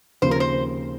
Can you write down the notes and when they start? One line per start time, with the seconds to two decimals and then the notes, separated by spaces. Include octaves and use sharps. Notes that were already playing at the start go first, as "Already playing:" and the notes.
0.22 D#2 C#3 F3 C4 C5
0.31 A#4
0.40 C5